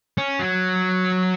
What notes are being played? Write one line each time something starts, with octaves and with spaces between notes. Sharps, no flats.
C#4
F#3